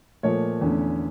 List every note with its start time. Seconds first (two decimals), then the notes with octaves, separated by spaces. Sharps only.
0.23 A#2 F3 A3 C#5
0.61 E2 D3 A3 C#4